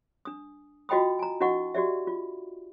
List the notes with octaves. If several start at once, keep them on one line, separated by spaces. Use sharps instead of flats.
D4 D#6
F4 F#4 D#5 G5 B5 D#6
G#5 A#5
D4 E4 F#4 D#5 F#5 C#6
F#4 G4 D5 E5
F4